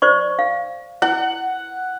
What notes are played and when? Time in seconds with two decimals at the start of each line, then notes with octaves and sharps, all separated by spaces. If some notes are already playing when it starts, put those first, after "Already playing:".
0.02 C5 D5 C#6
0.39 F5
1.02 E4 F#5